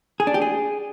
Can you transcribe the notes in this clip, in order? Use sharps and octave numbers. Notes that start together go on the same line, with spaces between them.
G#4
D4
G4
G#4